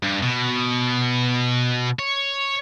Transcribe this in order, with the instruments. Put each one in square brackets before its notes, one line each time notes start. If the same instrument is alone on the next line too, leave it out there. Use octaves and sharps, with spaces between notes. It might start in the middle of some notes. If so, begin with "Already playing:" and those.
[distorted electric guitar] G2
B2
C#5